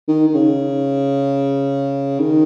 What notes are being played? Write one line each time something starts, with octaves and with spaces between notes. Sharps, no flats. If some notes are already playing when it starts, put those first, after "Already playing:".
D#3
D#3
C#3
D#3